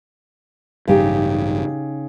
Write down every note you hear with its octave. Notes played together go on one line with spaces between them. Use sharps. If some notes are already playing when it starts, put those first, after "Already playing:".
A1 G2 C#3 D#4 G4